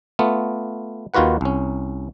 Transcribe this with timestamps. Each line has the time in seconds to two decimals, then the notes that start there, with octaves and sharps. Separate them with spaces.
0.19 A3 B3 F4
1.14 D#2 D#3 F4 F#4 B4 F#5
1.41 C2 C#4